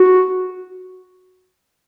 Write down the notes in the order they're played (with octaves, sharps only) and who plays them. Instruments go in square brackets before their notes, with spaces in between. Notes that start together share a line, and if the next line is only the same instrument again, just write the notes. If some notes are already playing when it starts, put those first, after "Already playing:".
Already playing: [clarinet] F#4